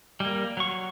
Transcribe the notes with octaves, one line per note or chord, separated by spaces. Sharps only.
G3 A#3
F#3 C#6